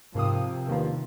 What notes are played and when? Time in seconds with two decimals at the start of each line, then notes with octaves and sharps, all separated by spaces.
0.15 G#2 C3 F3 A#3 C4 D#6
0.68 E2 G2 D#3 F3 A#3